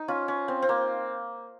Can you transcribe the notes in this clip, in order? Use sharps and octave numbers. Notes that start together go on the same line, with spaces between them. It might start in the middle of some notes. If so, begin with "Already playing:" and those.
Already playing: D#4
C#4 F4
C#4
C4
C4
A#3